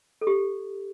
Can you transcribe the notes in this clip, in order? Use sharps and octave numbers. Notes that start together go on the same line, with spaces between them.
A4
G4